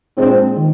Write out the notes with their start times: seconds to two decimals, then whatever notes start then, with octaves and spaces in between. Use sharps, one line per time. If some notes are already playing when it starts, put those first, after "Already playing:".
0.17 A#2 G#3 C4 D4
0.56 D#3